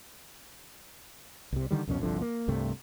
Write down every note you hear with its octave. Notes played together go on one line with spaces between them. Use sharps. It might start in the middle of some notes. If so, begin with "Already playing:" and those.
C2 C3
D3 D#3 G3
C2 F2 B2 C#4
G1 C2 D3 F3
A#3
C2 G2 C3 A3